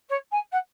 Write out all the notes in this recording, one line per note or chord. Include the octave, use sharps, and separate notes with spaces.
C#5
G#5
F#5